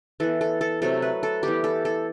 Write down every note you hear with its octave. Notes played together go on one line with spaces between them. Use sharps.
E3 B3 A4
A4
A4
C3 F#3 A3 A4
B4
A4
E3 G3 B3 G4
A4
A4